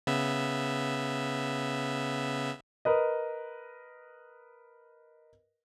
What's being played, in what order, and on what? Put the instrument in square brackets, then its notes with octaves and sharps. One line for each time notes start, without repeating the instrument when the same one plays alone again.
[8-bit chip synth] C#3 B3 E5
[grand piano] A#4 B4 D#5